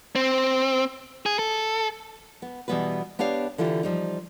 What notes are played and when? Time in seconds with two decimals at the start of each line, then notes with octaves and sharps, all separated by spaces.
0.15 C4
1.26 G#4
1.39 A4
2.42 B3
2.68 B2 E3 G3 B3 F#4 B4
3.19 B3 D4 G4 C#5 F5
3.58 D3 E3 E4 F4 G4
3.83 F3 G3 D#4